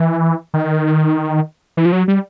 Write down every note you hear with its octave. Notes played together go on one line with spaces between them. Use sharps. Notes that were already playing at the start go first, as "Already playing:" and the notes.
Already playing: E3
D#3
E3
F3
F#3
G3